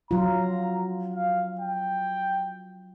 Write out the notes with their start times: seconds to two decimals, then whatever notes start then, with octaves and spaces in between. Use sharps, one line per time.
0.11 F#3 F4 A#5
1.14 F5
1.59 G5